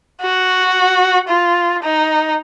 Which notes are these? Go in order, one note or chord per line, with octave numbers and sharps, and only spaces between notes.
F#4
F4
D#4